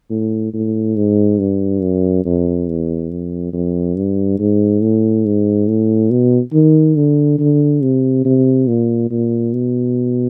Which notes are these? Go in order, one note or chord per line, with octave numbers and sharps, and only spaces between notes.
A2
A2
G#2
G2
F#2
F2
E2
F2
F2
G2
G#2
A2
G#2
A2
B2
D#3
D3
D3
C3
C3
A#2
A#2
B2